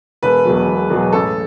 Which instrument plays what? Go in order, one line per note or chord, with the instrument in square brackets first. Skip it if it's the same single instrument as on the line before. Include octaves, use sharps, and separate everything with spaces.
[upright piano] E1 B4
E2 B2 F#3
E1
E2 B2 F#3
A1 A4